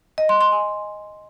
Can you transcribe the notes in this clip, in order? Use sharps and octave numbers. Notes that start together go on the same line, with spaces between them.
D#5
C6
C6
G#5